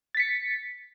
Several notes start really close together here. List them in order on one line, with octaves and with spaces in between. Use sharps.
A6 B6 C#7